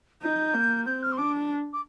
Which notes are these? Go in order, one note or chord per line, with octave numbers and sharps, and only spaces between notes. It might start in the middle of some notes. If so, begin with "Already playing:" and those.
D#4 G6
A#3
C4 G6
F6
C6
D4 D6
D6